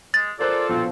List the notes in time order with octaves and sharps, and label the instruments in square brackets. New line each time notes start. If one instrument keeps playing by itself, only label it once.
[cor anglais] G#3 [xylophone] A6
[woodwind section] F4 A4 [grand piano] A#4 C5 F#6 [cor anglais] D5
[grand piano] A#1 B2 F3 [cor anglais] C4